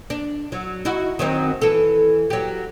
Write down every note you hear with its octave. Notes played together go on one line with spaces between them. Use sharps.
D4
F#3
D#4 E4 F#4
D#3 F#3 C4
E3 A4
F#3 G4